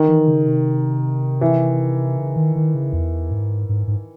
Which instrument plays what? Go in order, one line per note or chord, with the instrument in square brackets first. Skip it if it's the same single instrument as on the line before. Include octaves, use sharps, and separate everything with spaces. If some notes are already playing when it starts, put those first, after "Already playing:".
Already playing: [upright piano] D#3
[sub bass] E3
C#3
C3
[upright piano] E3
[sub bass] C#3
D#3
D#3
C#3
E2
G#2
G#2
G#2